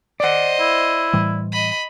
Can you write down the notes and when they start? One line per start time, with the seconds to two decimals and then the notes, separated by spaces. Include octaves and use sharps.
0.20 C5 D5 D#5 F#5
0.60 E4
1.13 A2 E3 G3
1.52 D#5 B5